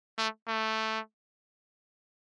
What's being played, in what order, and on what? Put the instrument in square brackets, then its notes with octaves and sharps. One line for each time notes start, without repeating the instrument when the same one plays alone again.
[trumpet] A3
A3